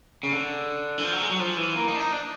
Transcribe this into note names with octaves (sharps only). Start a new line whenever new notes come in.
C#3
D3
E3
F3
F#3
G#3
F#3
F3
E3
A#3
D#4
D4
D#4
D4